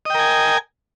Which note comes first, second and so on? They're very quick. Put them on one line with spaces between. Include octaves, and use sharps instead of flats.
D#5 G5 A#4 G#5